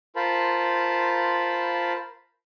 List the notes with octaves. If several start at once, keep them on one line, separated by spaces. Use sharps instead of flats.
F4 A#4 C5 A5 B5